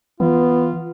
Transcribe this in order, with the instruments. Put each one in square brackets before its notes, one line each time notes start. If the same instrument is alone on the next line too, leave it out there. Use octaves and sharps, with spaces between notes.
[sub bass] E3 [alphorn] B3 [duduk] F4